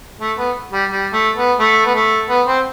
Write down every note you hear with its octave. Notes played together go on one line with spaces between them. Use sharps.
A3
B3
G3
G3
A3
B3
A3
B3
A3
B3
C4